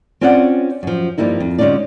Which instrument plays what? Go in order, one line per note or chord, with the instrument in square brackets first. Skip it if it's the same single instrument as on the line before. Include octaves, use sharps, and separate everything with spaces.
[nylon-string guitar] C4 C#4 F4 C#5 D5 F#5
F#2 F3
G2 F3 G3 A#3 D#4 E4
F2
D3 G#3 C#4 D#4 F4 D5